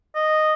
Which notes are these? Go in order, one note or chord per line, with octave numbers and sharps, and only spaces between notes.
D#5